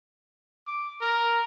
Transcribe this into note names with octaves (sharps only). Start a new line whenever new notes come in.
D6
A#4